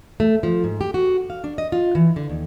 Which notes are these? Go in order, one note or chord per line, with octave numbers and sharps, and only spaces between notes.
A3
F3
G#2
G4
F#4
F5
D4
D#5
F4
E3
D3
D#2